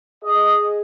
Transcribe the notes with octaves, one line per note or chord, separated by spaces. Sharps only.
G#4 D#5